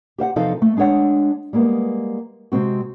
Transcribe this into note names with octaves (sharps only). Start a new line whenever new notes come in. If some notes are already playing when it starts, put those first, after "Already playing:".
G4 C5 F5 F#5
E2 C3 F3 D#4 A4 F5
A3
G#3 D4 G#4 C#5 F#5
G3 G#3 A#3 B3
C3 G#3 C4 F#4